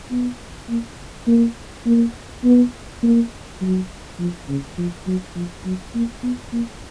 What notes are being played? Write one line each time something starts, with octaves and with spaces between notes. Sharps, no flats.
B3
A#3
A#3
A#3
B3
A#3
F#3
F3
C#3
F3
F#3
F3
F#3
A#3
B3
A#3